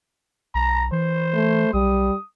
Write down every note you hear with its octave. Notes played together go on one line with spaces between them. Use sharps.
B1 A#5
E3 C5
A3
B1 G3 D#6